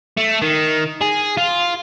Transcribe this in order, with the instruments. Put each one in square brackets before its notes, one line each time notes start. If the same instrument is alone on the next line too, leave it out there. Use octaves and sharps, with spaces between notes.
[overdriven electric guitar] A3
D#3
G#4
F4